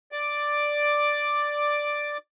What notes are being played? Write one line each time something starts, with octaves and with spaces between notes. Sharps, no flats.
D5 D6